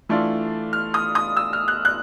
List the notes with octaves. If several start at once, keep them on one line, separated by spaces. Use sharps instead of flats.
E3 A3 D4 F4
F6
D#6
D#6
E6
F6
F#6
F#6